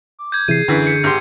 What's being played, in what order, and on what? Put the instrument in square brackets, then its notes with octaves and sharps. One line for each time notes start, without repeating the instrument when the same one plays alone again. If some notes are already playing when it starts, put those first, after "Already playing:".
[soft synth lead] D6
[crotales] G6 G#6
[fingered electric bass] C3 E3 [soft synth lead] G#4 [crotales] C7 D#7
[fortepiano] F#2 E3 [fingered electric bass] D3
[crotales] C#7
[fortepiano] G#1 G4 C6